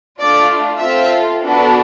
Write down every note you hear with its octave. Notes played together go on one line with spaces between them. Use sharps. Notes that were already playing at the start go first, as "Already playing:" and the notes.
A3 D4 F4 D5
C4 F4 A4 E5
B3 D4 F#4 A4